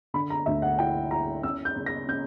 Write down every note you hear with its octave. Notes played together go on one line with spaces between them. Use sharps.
D3 B5
A#5
D2 E5
F#5
E4 G5
E4 A#5
C#4 E6
G6
C#3
A#6
C#4 G6